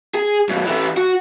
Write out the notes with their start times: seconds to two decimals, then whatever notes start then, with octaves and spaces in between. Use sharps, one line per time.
0.14 G#4
0.49 F#2 B2
0.66 E3 A3
0.98 F#4